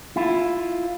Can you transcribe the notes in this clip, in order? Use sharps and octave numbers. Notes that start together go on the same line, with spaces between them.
E4 F4